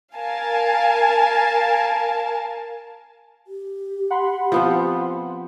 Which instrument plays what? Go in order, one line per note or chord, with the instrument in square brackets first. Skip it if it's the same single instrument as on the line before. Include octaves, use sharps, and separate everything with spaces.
[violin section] A#4 F5 G#5 A5
[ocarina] G4
[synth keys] F#5 B5 C6
[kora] F3 B3 C4